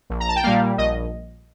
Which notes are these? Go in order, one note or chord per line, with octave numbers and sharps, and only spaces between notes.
A#1
A#5
A5
G5
A#2 G3 A#3 F5
A#1 D#5